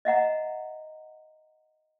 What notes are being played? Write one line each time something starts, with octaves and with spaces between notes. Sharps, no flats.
D#5 E5 F#5 A#5